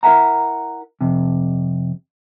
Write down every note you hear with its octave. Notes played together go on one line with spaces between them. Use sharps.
E4 A#4 B4 E5 F#5 A#5
F2 C3